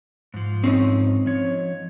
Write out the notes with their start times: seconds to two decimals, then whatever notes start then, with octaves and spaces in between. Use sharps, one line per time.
0.34 G#2 F3
0.64 C4 C#4 D#4
1.26 F3 C#5